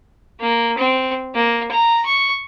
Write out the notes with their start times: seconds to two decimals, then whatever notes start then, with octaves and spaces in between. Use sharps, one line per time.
0.40 A#3
0.78 C4
1.34 A#3
1.71 A#5
2.05 C#6